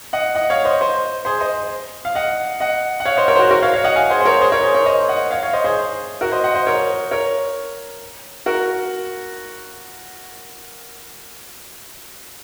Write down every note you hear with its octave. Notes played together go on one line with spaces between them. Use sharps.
D#5 F#5
D#5 F#5
C#5 F5
C5 D#5
C5 D#5
G#4 C5
C5 D#5
F5
D#5 F#5
D#5 F#5
F#5
C#5 F5
C5 D#5
A#4 C#5
C5
F#4 A#4
F#4 A#4
C#5 F5
C#5 F5
D#5 F#5
F5 G#5
G#4 C5
C5
A#4 C#5
G#4 C5
A#4 C#5
G#4 C5
A#4 C#5
C5 D#5
D#5 F#5
C#5 F5
C#5 F5
C5 D#5
G#4 C5
F#4 A#4
C5 D#5
D#5 F#5
C5 D#5
A#4 C#5
A#4 C#5
F#4 A#4